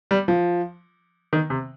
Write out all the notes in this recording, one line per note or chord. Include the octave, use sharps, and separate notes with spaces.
G3
F3
D#3
C3